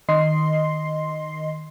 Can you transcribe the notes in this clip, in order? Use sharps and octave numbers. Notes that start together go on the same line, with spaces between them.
D#3 D#5 C6 C7